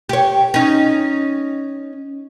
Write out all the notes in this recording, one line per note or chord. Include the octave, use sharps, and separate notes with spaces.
G4 C#5
C#4 D#4